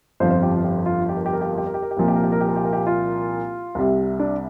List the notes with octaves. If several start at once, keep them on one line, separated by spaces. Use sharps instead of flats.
G1 F2 F3 C5
C5
G4
F4
G4
F4
G4
A#4
G4
A#4
G4
A#4
G4
A#4
G4
A#4
G4
C2 A#2 F3 A#4
G4
A#4
G4
A#4
G4
A#4
G4
A#4
G4
F4
C2 C3 G3
D4